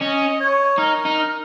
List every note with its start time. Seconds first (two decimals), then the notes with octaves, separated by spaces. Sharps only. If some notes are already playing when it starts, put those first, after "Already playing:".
0.01 C#4 D#5
0.40 C#5
0.78 D#4 A#4
1.06 D#4